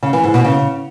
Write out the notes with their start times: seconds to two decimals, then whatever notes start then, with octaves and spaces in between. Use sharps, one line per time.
0.03 C#3
0.13 E3
0.24 G#2
0.34 B2
0.44 C#3